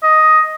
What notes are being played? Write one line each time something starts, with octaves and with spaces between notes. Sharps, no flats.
D#5